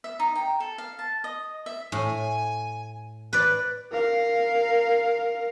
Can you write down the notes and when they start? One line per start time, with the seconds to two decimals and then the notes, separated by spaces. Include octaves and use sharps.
0.04 E5
0.20 D#4
0.35 G5
0.60 A4
0.78 F5
0.99 A5
1.24 D#5
1.66 E5
1.92 A2 G#5
3.33 B4 D5 F#6
3.91 A#4 F5